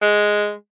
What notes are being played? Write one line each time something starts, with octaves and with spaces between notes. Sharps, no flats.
G#3